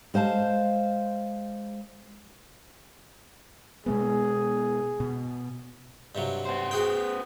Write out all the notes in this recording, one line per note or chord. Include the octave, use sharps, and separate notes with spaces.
G#3 C5 F5 A5
B2 G#3 B3 G#4
B2
G2 C3 F#3
B3 C5
F#4 G#4 G5